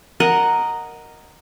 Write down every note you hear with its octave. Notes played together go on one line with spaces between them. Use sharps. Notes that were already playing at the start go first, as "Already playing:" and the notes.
A#4 D#5 F#5